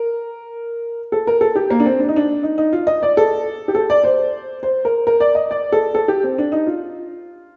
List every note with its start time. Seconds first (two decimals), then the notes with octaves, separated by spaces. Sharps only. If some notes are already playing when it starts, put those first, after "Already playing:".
Already playing: A#4
1.12 A4
1.27 A#4
1.41 A4
1.55 G4
1.70 A#3
1.80 D4
1.86 C4
2.00 D4
2.08 D#4
2.16 D4
2.43 D#4
2.58 D#4
2.73 F4
2.87 D#5
3.03 D5
3.17 A4
3.68 G4
3.75 A4
3.90 D5
4.04 C5
4.63 C5
4.85 A#4
5.07 A#4
5.20 D5
5.35 D#5
5.51 D5
5.72 A4
5.95 A4
6.08 G4
6.24 C4
6.38 D4
6.52 D#4
6.67 F4